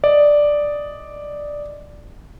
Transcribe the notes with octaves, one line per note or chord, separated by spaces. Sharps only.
D5 D#5